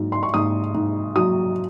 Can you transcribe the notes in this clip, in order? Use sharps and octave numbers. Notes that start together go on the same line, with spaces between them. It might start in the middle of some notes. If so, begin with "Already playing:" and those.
Already playing: G#2 F#3
C6
C#6
G#2 D#6
G#2
F#3 D#6